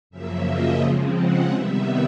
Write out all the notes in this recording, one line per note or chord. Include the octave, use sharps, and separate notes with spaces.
F#2 C#3 F3 A#3 E5
D#5
C#3 F3 G#3 C4
F#5
C3 D#3 G3 B3 E5